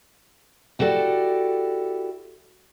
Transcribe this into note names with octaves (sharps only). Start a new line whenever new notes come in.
E4 F#4 G4 A4 D5